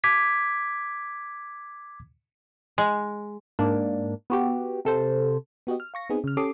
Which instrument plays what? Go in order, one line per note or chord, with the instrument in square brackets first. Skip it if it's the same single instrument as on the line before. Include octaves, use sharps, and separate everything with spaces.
[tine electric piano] D6 G#6 B6
[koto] G#3
[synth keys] G#2 A#3 D4
B3 F#4 G4
C3 A4 C5
[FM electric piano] B3 F#4 G4 D#5
F6
F5 C#6 A#6
B3 C4 D#4 G#4
C#3 F6
C#4 G4 A4 D6 D#6 C7